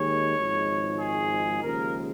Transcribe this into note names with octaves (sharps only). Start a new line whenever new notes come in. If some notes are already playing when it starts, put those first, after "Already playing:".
Already playing: D#2 D#3 G#3 C#5
G#1 G#2 F3 G#3
G#4
D#2 C#3 F3 G#3 A#4